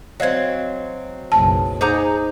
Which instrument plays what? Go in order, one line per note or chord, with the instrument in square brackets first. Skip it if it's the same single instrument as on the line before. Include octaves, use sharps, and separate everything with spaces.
[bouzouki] F#3 C4 [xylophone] D#5 F5 G#6
[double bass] F#1 B1 [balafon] A5
[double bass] D#4 [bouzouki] G#4 F#5 A#5 [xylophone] C5 D6 G6